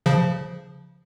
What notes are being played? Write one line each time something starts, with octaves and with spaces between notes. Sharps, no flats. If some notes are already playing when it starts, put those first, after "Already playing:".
C#3 F3